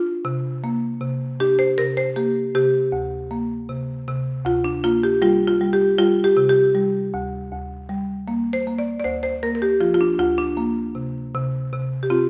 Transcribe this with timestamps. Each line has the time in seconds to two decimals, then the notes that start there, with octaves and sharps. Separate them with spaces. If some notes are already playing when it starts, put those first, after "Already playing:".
Already playing: D4 F4
0.25 C3
0.64 A#3
1.01 C3
1.40 D4 G4
1.59 C5
1.78 C3 A#4
1.97 C5
2.16 A#3 G4
2.55 C3 G4
2.92 D2
3.31 A#3
3.69 C3
4.08 C3
4.45 D2 F4
4.64 D4
4.84 A#3 F4
5.03 G4
5.22 G3 F4
5.48 F4
5.61 G3
5.73 G4
5.98 G3 F4
6.24 G4
6.37 C3
6.49 G4
6.75 G3
7.14 D2
7.52 D2
7.89 G3
8.28 A#3
8.53 C5
8.67 A#3
8.79 D5
9.00 D5
9.04 D2 C5
9.23 C5
9.43 A#3 A#4
9.55 A#4
9.62 G4
9.80 F3 F4
9.94 F4
10.01 D4
10.19 D2 F4
10.38 D4
10.57 A#3
10.95 C3
11.34 C3
11.72 C3
12.03 G4
12.10 C4 F4